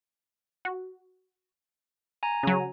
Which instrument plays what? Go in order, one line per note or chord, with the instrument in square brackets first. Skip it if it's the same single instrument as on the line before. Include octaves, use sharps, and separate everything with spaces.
[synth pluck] F#4
[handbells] G#5 A#5
[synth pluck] C#3 F#3